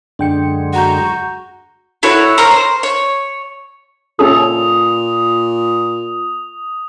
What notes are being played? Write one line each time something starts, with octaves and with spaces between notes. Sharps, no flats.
F#2 D3 G#3 D4 G5 C#7
F#4 F#5 A#5 G6
E4 F#4 A4 C#5
A#4 C5 C#5 A#5
C5
C#5
A#2 C#4 G#4 A4 D#6